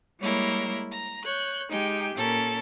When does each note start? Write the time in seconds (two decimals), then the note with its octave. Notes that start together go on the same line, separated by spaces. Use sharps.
0.19 G3 G#3 A#3 E4 A#4 C#5
0.91 A#5
1.23 C#5 F#6 G6
1.69 G#3 D#4 G4 G5 G#5
2.14 A#2 C#4 A4 A#4